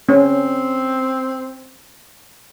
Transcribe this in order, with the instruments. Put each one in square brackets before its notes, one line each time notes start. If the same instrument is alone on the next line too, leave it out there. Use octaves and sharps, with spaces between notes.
[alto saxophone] C4 [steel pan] C#4